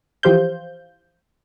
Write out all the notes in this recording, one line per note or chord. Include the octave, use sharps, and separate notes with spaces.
E3 F3 G4 C5 F5 G6